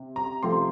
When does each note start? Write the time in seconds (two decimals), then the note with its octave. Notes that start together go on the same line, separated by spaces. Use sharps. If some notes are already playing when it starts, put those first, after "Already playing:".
Already playing: C3 C4
0.16 A#5
0.43 C3 F3 A3 C4 C6